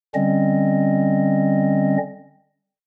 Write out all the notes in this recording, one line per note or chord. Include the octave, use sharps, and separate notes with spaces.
D3 G3 C4 C#4 D#5